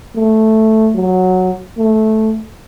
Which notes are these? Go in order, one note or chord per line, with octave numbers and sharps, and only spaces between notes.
A3
F#3
A3